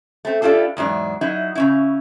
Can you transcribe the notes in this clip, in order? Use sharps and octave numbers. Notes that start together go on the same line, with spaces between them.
A3 C4
D4 E4 F4 G4 A4
E2 G#2 F#3 D4
F#3 D#4 E4
C#3 C#4 E4